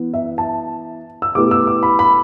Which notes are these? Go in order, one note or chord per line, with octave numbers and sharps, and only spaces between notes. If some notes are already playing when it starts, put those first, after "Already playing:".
Already playing: E3 B3
E5
A5
E6
B2 A3 E4 G4 B4 D6
E6
D6
B5
B5